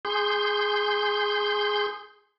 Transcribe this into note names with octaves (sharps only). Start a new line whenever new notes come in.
G#4 C6 G6